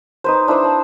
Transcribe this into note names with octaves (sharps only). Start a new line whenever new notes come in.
D#4 B4 C5
D4 E4 B4 C5
C5 A5